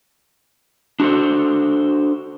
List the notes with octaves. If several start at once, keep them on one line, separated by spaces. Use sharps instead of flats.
D4 F#4 G4 A4 C5